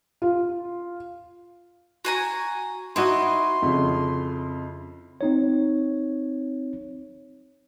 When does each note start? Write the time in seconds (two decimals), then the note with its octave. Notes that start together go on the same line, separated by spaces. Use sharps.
0.22 F4
2.05 F#4 G#5 A#5
2.96 D#4 E4 F#4 C5 D#5 C6
3.62 F2 C#3
5.21 C4 D#4 C#5